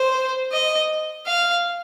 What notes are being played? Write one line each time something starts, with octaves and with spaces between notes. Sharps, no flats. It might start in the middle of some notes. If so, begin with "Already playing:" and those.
Already playing: C5
D#5
F5